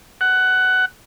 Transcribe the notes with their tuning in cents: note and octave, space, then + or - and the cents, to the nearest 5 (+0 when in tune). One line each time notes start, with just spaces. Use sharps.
F#5 +15